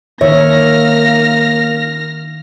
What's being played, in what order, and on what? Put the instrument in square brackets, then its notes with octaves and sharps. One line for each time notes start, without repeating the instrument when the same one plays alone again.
[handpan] D#3 E5 [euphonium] A#3 [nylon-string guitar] C#5 [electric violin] F6 A#6